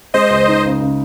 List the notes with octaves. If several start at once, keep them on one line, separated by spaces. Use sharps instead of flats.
G#3 C5 D#5
C#2
D#4
C#3
C#3